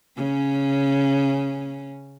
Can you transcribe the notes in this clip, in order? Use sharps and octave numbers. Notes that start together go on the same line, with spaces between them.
C#3 C#4